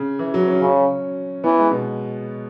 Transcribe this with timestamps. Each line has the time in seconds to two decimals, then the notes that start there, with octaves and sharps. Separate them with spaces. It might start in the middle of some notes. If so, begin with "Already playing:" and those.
Already playing: C#3
0.19 E3
0.34 F#3
0.48 C#4
0.61 C#3
1.44 E3 B3
1.59 G#3
1.71 B2